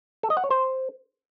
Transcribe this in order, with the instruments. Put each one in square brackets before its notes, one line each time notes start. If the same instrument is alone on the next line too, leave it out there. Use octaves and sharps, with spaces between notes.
[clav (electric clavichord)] A4
D#5
F#5
C#5
C5